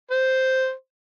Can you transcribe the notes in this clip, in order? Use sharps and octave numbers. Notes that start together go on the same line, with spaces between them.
C5